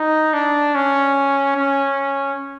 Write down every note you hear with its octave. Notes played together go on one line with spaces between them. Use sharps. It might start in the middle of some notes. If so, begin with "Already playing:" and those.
Already playing: D#4
D4
C#4
C#4